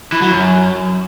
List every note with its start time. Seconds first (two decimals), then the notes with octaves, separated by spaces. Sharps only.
0.12 E3
0.22 F#3
0.31 F#2